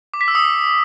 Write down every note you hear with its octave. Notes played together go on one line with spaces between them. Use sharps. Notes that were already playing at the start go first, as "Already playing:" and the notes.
D6
B6
E6
D#6